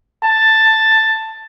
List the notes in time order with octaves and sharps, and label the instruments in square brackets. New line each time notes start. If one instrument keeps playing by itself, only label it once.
[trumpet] A5